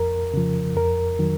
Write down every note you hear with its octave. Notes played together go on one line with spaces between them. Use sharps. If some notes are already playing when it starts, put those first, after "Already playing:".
Already playing: F2 A#4
C#3 F3
F2 A#4
D#3 F#3